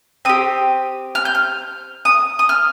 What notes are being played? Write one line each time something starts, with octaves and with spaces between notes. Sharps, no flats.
C4 G4 D#6
F6
G6
F6
D#6
D#6
F6